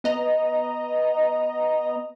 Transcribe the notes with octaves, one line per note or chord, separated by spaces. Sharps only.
B3 D#5 A#5